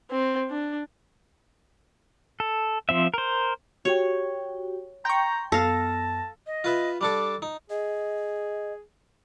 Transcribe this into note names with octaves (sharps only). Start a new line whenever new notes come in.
C4
D4
A4
F3 C4 E5
A#4 C5
F#4 G4 C#5 G5
G5 A#5 C6 C#6 G6
F#2 B3 A4 F5 A5 A#6
D#5
F4 B4 E5
G3 D4 A4 D6
D#4
G#4 D#5